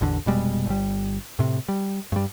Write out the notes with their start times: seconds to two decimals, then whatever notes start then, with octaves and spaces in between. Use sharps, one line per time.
0.01 A1 E2 D3
0.26 F1 B2 G3 G#3
0.66 G1 G3
1.39 A2 C3
1.68 G3
2.12 G2 G3